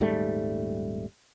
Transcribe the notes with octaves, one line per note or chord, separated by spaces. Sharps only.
D#1 G#2 G3 A3